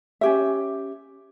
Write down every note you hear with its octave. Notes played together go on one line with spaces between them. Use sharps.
C#4 G4 E5